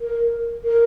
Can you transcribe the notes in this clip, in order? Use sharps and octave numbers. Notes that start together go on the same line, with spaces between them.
A#4
A#4